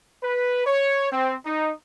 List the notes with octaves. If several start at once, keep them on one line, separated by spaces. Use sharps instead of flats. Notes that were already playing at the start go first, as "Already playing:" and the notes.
B4
C#5
C4
D#4